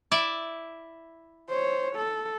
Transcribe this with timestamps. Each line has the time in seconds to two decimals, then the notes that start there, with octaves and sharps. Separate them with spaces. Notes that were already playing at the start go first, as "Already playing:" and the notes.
0.11 E4 D5 E5
1.49 C5 C#5
1.96 A4